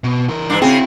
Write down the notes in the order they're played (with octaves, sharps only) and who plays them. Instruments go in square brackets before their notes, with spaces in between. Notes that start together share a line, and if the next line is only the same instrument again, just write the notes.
[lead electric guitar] B2
E3 A#4
[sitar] G2 D4
[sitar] C#3 G#4 [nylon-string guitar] C4 G5 [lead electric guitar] E4 F#4